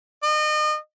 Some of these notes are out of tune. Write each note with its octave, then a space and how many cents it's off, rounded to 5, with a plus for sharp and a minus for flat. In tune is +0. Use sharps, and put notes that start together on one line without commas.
D#5 -35